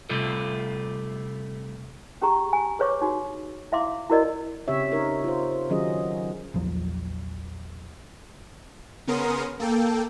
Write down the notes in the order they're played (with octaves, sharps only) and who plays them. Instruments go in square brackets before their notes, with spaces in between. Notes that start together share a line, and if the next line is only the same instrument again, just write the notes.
[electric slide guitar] C3 G3 A3 F4 A4
[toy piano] C#4 G4 G#4 A#5 C#6
G#5
G#4 B4 C#5 C#6 D6
D#4 F#4
E4 E5 F5 C6 D6
E4 F#4 A#4 D5 D#5
[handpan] C#3 C4 G4 C#5 E5
D#4 A#4 C#5
F4 C5
D#3 F#3 C#4 F4 G#4 D#5
[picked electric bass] A#1 E2 F3 F#3
[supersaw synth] C#3 B3 C#4 A#4 C6 D#6
A#3 A4 G5